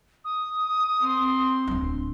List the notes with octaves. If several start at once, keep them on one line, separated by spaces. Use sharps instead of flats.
D#6
C4 C6
D1 D4